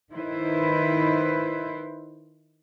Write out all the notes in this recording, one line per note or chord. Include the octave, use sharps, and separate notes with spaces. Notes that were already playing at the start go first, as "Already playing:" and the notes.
D#3 E4 B4 C5